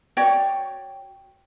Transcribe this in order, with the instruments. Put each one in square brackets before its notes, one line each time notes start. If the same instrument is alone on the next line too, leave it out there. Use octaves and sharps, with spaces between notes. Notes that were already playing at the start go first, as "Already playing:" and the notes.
[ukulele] F#4 C#5 D5 G5